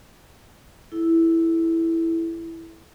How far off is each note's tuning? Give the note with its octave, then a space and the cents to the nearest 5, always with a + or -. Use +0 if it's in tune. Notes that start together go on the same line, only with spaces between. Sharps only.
E4 +0 A4 -35